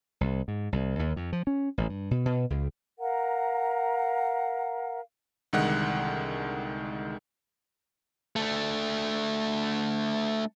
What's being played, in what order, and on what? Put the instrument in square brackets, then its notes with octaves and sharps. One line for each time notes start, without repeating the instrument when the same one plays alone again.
[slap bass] C2
G#2
C2
D#2
F2
F3
C#4
A1
G2
B2
B2
C#2
[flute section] A#4 F5 F#5 A#5
[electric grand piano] C2 D3 D#3 G#3 F#5 F#6
[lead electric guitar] A3 D4